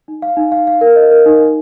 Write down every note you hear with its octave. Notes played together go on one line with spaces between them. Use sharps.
D#4
F5
D#4
F5
F5
A#4
D#5
A#4
D#4
D#4